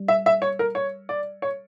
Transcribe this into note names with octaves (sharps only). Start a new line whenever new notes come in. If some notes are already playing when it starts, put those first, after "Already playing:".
Already playing: G3
E5
E5
C#5
A#4
C#5
D5
C#5